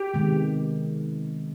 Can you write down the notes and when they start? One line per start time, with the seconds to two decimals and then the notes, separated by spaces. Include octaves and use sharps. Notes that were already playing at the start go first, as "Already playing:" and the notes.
Already playing: G4
0.14 C3 D#3 G#3 B3